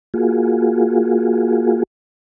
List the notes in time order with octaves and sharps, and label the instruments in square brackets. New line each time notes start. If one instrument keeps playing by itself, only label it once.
[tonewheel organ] A#3 F4 F#4 G#4